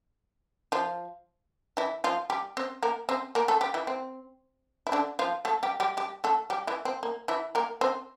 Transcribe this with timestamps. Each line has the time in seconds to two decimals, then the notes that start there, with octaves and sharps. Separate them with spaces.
0.72 F3 F4
1.77 E3 E4
2.04 F3 F4
2.30 G3 G4
2.57 C4 C5
2.83 A#3 A#4
3.09 C4 C5
3.35 A#3 A#4
3.48 A3 A4
3.61 G3 G4
3.74 E3 E4
3.87 C4
4.87 E4
4.92 D3 D4
5.19 F3 F4
5.45 A3 A4
5.63 G3 G4
5.80 G3 G4
5.97 G3 G4
6.24 A3 A4
6.50 G3 G4
6.67 E3 E4
6.85 C4
7.03 A#3
7.28 E3 E4
7.55 A#3 A#4
7.81 C4 C5